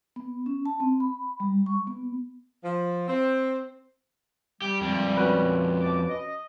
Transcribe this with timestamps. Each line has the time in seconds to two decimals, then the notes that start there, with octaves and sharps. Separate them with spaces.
0.16 B3
0.46 C#4
0.66 A5
0.80 C4
1.00 B5
1.40 G3
1.66 C#6
1.87 B3
2.63 F3
3.08 C4
4.62 G3 G4
4.81 F2 D4
5.17 C#4 F#4 B4
5.81 F3 A5 D6
6.09 D#5